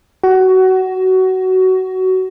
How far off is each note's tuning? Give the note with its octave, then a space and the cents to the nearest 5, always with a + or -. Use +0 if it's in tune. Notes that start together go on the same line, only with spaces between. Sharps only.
F#4 +20